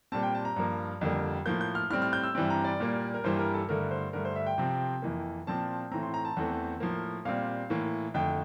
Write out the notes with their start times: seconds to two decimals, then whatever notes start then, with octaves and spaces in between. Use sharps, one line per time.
0.12 A#2 G3 C4 A5
0.23 G5
0.35 A5
0.45 A#5
0.56 G2 F3 A#3
1.01 F2 D3 G3 A#3
1.46 A2 F3 A#3 G6
1.61 G6
1.75 F6
1.90 A2 G3 C4 F6
2.02 F6
2.13 G6
2.23 E6
2.35 G2 E3 G3 C4
2.50 A#5
2.64 D5
2.80 A#2 G3 A#3
3.14 A#4
3.24 G2 E3 G3 A#3 C5
3.39 A#4
3.54 A4
3.69 G2 D3 A3 A#4
3.91 C5
4.13 G2 D3 A3 A#4
4.25 C5
4.36 E5
4.46 G5
4.58 C3 F3 C4
5.02 F2 E3 A#3
5.47 A#2 F3 C4 A5
5.91 A2 E3 A3 C4 A#5
6.03 C6
6.14 A#5
6.25 A5
6.37 E2 E3 A3 C4
6.80 A2 F3 A#3
7.25 A#2 G3 C4 F5
7.70 A2 E3 A#3
8.14 F2 D3 A3 G5